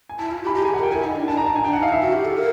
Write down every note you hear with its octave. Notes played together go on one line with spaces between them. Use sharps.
G#5
E4 A5
F4
G4
B5
G4 A#5
G#4 G#5
G4
F#5
A#4 G5
E4 G#5
D#4
D4
D4 A5
A#5
D#4
A5
G#5
D4 G5
F#5
D#4
F5
E4 E5
F#4
G4
A4
A#4